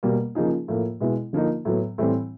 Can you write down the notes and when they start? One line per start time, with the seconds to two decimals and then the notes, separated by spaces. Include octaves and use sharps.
0.03 B2 G3 A#3
0.35 C#3 F3 A#3 D#4 G#4
0.68 A2 F3 A#3
1.01 B2 G#3 B3 E4
1.33 D3 F3 A#3 D#4
1.65 A2 F#3 B3
1.98 A2 E3 G3 C4